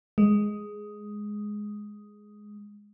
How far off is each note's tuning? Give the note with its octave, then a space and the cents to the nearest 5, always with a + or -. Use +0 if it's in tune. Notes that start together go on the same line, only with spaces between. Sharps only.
G#3 +5